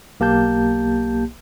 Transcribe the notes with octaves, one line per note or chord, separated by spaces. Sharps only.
B1 A#3 G4 A5 G6